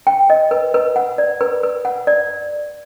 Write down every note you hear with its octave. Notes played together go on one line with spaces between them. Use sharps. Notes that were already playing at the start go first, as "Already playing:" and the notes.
G5
D#5
B4
B4
F#5
D5
B4
B4
F#5
D5